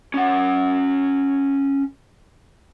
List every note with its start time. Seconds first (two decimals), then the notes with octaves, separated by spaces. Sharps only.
0.14 C#4 F#5